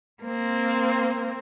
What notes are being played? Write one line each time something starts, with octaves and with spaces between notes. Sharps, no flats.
A#3 C4